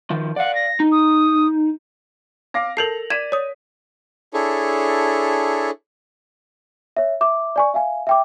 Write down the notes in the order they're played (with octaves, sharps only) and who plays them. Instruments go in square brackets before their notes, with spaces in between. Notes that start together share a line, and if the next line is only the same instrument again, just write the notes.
[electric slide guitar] D#3 F3
[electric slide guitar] D5 F5 [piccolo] F#5
[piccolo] A#6
[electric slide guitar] D#4
[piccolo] D#6
[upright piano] F5 D6 A#6
[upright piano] A4 F7 F#7 [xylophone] A#4 G6 C7
[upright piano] D5 B6 D#7 [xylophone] G#6 E7
[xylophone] C#5 D#6
[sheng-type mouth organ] D4 E4 G#4 A4 C#5
[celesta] C#5 E5
E5 D6
D5 G#5 C#6
E5 F5 G#5
E5 G5 D6